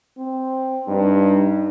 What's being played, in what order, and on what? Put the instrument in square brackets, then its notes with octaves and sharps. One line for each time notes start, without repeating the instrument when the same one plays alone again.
[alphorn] C4
[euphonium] G2 [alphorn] D#4